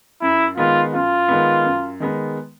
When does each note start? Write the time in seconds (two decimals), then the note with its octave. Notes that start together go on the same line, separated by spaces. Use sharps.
0.22 F#2 E4
0.57 D#3 G#3 B3 F4
0.93 F#2 F4
1.29 D#3 G#3 B3
1.65 F#2
2.00 D#3 G#3 B3